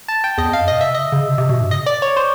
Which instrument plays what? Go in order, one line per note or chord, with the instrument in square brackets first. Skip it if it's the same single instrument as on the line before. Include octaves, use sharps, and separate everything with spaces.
[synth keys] A5
G5
[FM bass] E2 [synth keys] D#5
[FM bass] F2 [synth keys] F5
[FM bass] F#2
[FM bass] B2 [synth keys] D#5
[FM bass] C3 [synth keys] E5
[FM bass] C#3 [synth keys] D#5
[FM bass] C#3
C3
C3
B2
G2
[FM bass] C#3 [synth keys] D#5
[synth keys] D5
C#5
C5